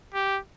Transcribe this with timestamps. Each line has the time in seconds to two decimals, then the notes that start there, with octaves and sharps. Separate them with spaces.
0.14 G4